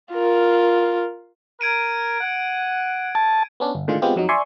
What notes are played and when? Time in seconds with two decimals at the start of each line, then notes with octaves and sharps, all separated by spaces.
0.12 F4 A#4
1.61 A#4 G#6 D7 D#7
2.21 F#5
3.15 A5
3.60 B3 C#4 D4
3.75 G1
3.88 A2 D3 D#3 G#3 F4
4.02 G#3 B3 C4 F4 G4
4.16 F2 F#3 D#4
4.29 D5 E5 G#5 C6 C#6